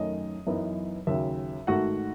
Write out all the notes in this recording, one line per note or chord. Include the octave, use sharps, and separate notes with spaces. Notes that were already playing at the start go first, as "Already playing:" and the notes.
Already playing: F#2 D#3 A3 C#4 D#5
F#2 E3 B3 D#4
D#2 C#3 F#3 E5
G#2 D#3 A3 F#4 F#5